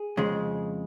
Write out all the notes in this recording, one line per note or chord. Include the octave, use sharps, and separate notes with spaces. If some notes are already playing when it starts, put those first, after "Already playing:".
Already playing: G#4
F2 C#3 G#3